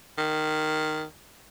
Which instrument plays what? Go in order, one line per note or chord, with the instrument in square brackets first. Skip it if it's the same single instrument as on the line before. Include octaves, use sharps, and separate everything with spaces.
[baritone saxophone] D#3